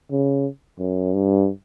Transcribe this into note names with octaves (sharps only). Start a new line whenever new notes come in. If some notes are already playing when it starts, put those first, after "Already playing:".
C#3
F#2
G2